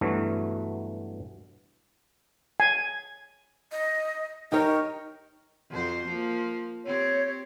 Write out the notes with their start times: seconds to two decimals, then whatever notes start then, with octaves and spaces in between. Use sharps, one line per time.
0.01 G2 B2 E3 F#3 A3
2.60 G#5
3.72 D#5
4.52 D#4 G4 A#4 C#5
5.70 F2 F#4 C5
6.08 F3 A#3
6.86 C4 G4 C#5